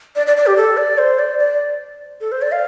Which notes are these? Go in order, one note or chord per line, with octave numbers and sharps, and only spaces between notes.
D5
D5
D5
G4
A4
D5
C5
D5
D5
A4
C5
D5
F5